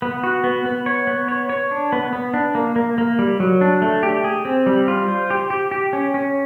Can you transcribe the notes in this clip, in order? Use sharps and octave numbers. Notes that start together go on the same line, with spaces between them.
B3
F#4
B3
B3
C#5
B3
C#5
C#5
D4
B3
B3
D4
A#3
A#3
A#3
G3
F#3
D4
A3
G4
G#4
C4
G3
F4
C5
G4
G4
G4
C#4
C#4